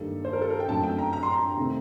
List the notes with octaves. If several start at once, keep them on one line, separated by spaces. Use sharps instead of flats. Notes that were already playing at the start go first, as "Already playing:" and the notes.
Already playing: G2 D#3 G3 A#3 A4
C5
A#4
A4
A#4
G5
F#2 D3 F#3 A3 C4 A5
G5
A#5
A#5
C6
A#5
C3 D#3 A3 C4